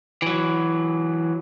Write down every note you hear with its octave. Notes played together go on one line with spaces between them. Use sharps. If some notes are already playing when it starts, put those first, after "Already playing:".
E3 F#3